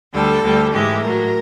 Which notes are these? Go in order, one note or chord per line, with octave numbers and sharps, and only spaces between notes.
D2 D3 G3 A4
D2 D3 G3
G#2 E3 G#3 G4
A2 F#3 A#4